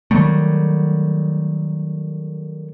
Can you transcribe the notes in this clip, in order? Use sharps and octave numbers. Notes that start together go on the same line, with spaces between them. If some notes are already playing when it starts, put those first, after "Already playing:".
D#3 F#3 G3 A3